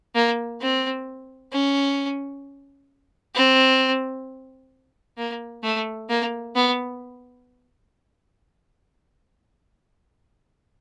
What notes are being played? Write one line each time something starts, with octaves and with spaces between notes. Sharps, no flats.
A#3
C4
C#4
C4
A#3
A3
A#3
B3